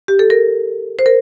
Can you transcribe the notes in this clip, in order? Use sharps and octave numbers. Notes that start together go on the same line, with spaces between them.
G4
A4
A#4
C5
A#4